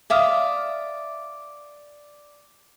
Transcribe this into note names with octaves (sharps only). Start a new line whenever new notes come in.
D5 E5 F5 D#6